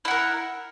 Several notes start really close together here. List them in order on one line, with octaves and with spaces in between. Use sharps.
E4 F#5 A#4